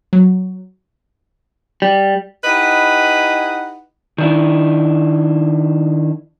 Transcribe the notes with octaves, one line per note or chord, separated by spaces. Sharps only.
F#3
G3
D#4 E4 G4 B4 D#5 F#5
D#3 D4 E4